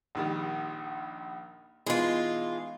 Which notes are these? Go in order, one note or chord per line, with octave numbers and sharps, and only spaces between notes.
A#1 D#3 G3
B2 E3 G#3 D#4 F4